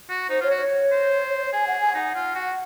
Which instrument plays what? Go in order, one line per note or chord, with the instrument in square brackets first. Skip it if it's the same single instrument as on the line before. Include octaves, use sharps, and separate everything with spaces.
[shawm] F#4
[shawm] D#4 [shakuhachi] C5
[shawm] F4 [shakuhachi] C#5
[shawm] F#4
[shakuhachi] C#5
[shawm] C5
[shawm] G#4 [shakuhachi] G#5
[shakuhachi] F#5
G#5
[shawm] D#4 [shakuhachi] F#5
[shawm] F4
F#4